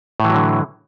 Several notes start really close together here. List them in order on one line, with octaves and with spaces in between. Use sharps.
A2 E3 F#3 D3